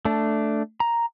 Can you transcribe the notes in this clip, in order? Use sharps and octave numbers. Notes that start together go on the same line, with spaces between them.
A3 D4
A#5